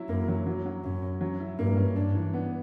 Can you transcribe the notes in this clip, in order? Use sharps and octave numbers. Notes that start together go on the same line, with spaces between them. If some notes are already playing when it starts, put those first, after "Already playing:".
Already playing: F#3 E4
F#2 A#3
F#3
F#3
F#3
F#2 C#4
C#4
F#3
E4
G2 A#3
C#4
G2 D4
E3
B3